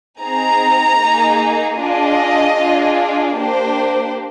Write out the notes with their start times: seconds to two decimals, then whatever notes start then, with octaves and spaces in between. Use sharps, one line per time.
0.20 C4 D#4 G#4 A#5
0.99 A#3 D#4 G#4
1.79 D4 F4 G#4 D#5
2.58 D4 F4 G#4
3.37 A#3 D4 G4 C5